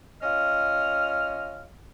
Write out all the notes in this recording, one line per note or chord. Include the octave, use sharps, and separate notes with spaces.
C#4 F4 D#5 F6